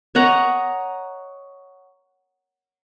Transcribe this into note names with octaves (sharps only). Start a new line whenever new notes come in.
C#5 D#5 F#5 A#5